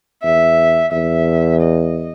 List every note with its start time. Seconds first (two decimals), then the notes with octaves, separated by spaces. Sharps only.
0.24 E2 E5
0.92 E2 E5
1.61 D#5